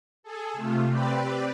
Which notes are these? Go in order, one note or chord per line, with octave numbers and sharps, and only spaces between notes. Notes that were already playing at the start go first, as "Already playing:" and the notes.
G#4 A4
C3 A3 F4
C4 G4 B4 D5